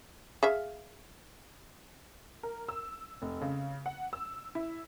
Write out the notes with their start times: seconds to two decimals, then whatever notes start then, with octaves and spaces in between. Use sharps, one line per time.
0.43 G#4 E5 F5
2.43 A#4
2.69 E6
3.22 F1
3.41 C#3
3.86 F#5
4.13 E6
4.55 E4